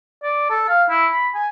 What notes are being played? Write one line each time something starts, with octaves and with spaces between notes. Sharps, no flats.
D5
A4
F5
E4
B5
G#5